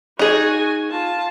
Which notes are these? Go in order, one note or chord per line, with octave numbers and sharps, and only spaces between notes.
D#4 F#4 G#4 G#5
F4 A5